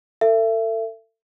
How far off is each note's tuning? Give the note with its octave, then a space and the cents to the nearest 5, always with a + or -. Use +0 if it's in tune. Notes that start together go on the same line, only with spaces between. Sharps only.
A4 +35 E5 +25